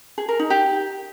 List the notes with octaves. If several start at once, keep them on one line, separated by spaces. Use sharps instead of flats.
G#4
A#4
D#4
G4